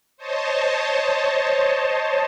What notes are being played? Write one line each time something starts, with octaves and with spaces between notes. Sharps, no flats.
C5 C#5 D#5 A5